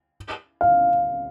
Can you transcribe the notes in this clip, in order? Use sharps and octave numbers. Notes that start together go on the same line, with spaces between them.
F5